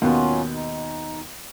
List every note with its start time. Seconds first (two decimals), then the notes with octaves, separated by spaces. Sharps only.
0.02 D#2 B2 F#3 B3 C#4 F4
0.54 D#4